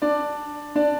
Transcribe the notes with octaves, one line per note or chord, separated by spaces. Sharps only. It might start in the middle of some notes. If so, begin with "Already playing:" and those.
D4 D5
D4 D5